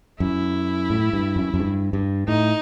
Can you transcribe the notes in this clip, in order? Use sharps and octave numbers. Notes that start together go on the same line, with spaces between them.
F#2 E4
A2
G2
F#2
F#2
G2
G2
A2 D#4